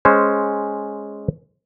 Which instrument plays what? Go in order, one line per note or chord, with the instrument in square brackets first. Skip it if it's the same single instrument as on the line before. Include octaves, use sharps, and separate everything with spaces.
[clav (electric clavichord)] G#3 C#4 C5